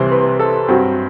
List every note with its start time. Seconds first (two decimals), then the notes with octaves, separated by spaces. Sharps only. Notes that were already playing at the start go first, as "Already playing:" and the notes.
Already playing: C2 C3 E3 C5
0.12 B4
0.39 A4
0.68 G2 F#3 C4 F#4